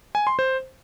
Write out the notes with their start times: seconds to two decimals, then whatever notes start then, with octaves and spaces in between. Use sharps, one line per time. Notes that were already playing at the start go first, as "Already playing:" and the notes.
0.15 G#5
0.27 C6
0.39 C5